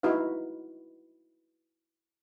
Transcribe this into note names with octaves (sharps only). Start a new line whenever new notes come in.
D#4 E4 F#4 B4 F5